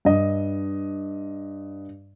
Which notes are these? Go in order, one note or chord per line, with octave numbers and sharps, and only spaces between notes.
G2 D#5